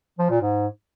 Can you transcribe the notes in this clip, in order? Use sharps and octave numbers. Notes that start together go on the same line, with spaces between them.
F3
A#2
G#2